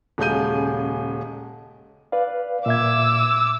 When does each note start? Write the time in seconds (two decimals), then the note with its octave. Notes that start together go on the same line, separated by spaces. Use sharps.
0.18 D#1 C#3 G#3 G6 D#7
2.12 B4 D5 F5
2.66 A#2 E5 D6 E6 G#6